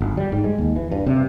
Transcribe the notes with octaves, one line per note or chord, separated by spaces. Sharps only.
G1
G3
G#2
G#3
D#2
E3
G2
C3